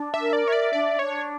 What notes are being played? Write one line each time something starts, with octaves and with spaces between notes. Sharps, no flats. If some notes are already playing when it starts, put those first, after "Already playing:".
Already playing: D4
E5
A#4
D5
C#5 E5
D5
D4 D5
D4 C#5